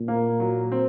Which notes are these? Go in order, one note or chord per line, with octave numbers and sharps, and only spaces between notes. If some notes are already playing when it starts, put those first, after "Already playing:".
Already playing: A#2
A#3
F#3
C4